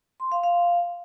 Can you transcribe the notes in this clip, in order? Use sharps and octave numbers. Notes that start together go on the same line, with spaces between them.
C6
F5
F5